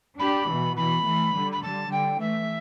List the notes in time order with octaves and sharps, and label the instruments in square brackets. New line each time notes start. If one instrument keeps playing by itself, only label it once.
[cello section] D4 G4 [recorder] B5
[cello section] B2 E3
[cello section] B2 E3 [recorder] B5
[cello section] E3 A3
D3 G3
[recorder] B5
[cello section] D3 G3 [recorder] A5
[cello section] D3 G3 [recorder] G5
[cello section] E3 A3 [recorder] E5